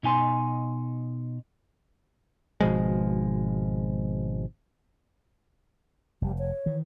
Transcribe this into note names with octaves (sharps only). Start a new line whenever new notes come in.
B2 D#4 G#5 C6
G#1 B2 F3 G#3
F1 G3
C#5
D#3 E3